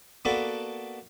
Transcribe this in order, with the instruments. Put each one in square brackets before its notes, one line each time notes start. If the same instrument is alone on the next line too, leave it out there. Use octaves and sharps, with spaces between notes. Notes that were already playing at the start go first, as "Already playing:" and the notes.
[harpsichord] A#3 B3 D4 F#4 A4 B4